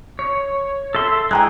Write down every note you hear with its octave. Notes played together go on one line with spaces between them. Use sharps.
C#5
A4 E5 C6
E3 G#3 G5 A#5 F#6